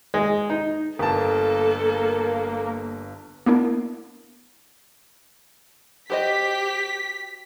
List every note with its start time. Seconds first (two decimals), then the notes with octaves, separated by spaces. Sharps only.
0.14 G#3
0.50 D#4
0.99 G1 A#3 A4 A5
3.46 A#3 B3 D4 E4 A#4
6.10 F#4 G4 C5 D#5 B6